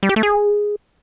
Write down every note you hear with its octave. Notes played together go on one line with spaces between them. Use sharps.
G3
G4
A3
G#4